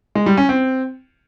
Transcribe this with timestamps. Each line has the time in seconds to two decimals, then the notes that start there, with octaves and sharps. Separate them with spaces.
0.15 G#3
0.26 G3
0.37 C#4
0.49 C4